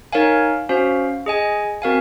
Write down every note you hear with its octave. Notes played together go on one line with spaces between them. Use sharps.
D#4 A#4 C#5 F5 G#5
C#4 F#4 C5 F5
G#4 D#5 G#5
C4 F#4 A#4 F5 G#5